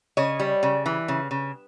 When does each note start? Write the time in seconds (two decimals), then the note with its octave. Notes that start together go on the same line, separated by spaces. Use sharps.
0.17 C#3 C#5 D#5
0.40 G3
0.63 C#3
0.86 E3
1.08 C#3
1.31 C#3